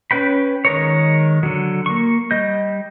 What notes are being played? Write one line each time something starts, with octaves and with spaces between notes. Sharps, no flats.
C#4 B4 G5 B5
D#3 G#3 A#4 C#5
D3 F#3
A#3 C#6
G3 D#5 G6